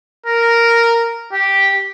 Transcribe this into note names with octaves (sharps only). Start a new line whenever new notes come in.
A#4
G4